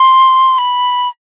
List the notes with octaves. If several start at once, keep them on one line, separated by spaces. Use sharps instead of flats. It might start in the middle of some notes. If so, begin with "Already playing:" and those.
Already playing: C6
B5